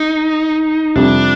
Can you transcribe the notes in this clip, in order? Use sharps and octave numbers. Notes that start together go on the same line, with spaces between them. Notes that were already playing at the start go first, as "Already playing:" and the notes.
Already playing: D#4
F2 C3 G3 D4